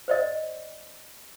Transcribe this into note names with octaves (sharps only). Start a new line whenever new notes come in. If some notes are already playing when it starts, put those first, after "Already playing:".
C5 D5 D#5